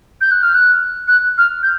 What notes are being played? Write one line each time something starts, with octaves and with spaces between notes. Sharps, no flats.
G6
F#6
F6
F#6
F#6
F6
G6